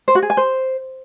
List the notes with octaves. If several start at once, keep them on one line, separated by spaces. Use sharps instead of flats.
C5
F#4
G#4
G#5
C5